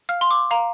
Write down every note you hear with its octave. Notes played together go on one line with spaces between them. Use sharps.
F5 F6
C6
D6
F5 A#5